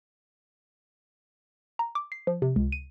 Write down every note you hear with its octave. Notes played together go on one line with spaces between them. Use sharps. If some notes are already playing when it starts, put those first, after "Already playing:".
A#5
D6
C7
F3
C3
C#2
D#7